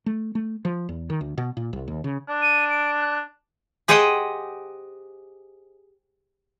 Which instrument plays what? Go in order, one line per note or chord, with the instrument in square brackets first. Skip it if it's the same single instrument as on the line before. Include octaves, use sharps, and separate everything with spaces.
[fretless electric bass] A3
A3
F3
E2
D#3
D2
B2
A#2
C2
D#2
C#3
[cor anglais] D4
[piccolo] D#7
D7
F#6
[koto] G4 G#4 C5 D#5 F#5 G5